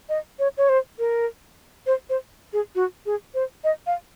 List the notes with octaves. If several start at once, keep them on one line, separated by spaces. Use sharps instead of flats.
D#5
C#5
C#5
C5
A#4
C5
C5
G#4
F#4
G#4
C5
D#5
F5